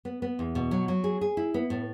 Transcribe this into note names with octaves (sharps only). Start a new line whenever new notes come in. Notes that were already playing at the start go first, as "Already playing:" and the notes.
B3
B3
E2
B2
F#3
F#3
G#4
G#4
E4
B3
A2